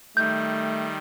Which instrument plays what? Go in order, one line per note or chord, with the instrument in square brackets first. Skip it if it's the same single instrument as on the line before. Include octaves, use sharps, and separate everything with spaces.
[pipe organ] D#3 G3 [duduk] A3 [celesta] G6